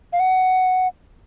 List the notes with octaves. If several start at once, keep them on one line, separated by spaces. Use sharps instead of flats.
F5
F#5